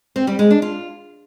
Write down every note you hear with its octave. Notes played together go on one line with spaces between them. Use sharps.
C4
G3
G#3
D4
F4